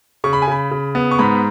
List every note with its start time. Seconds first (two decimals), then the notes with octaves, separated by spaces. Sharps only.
0.24 C#3 C#6
0.33 B5
0.42 G#5
0.48 C#3 B5
0.71 C#3
0.95 B3
1.11 C#6
1.19 G#2 B5